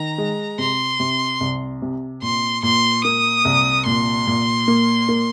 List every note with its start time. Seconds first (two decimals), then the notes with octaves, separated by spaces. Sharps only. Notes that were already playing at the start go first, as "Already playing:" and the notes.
Already playing: D#3 A#5
0.18 G#3
0.58 C3 C6
1.00 C3
1.41 C2
1.82 C3
2.22 A#2 C6
2.63 A#2 C6
3.04 A#3 D#6
3.45 C2
3.86 A#2 C6
4.27 A#2
4.68 A#3
5.08 A#3